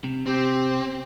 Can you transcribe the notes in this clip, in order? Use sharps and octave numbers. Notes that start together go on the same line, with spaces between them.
C3
C4 G4